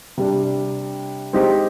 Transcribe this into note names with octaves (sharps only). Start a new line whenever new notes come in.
C3 G3 D4
G#3 C4 D#4 G4 C5